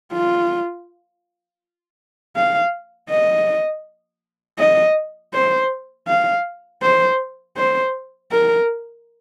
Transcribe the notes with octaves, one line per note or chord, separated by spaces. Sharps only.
F4
F5
D#5
D#5
C5
F5
C5
C5
A#4